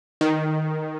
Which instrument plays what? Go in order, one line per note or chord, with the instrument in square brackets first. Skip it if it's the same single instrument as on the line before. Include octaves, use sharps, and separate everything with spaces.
[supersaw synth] D#3